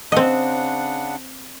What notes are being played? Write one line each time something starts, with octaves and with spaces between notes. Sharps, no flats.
C#3 C4 D4 D#5 F#5